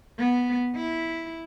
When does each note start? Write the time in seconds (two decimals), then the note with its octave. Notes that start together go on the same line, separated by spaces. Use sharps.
0.19 B3
0.76 E4